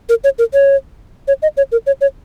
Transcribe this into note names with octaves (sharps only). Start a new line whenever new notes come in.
A#4
C#5
A#4
C#5
C#5
D#5
C#5
A#4
C#5
C#5